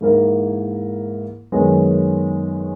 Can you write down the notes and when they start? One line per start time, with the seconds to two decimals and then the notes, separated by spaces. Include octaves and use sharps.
0.01 G#2 E3 A#3 E4 A#4
1.52 F#2 D#3 G#3 B3